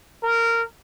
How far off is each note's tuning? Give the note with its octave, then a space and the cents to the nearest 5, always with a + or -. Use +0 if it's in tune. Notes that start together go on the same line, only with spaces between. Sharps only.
A#4 -15